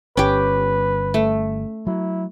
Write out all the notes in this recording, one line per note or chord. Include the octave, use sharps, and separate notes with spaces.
G1 C#4 G4 B4
A3
F#3 E4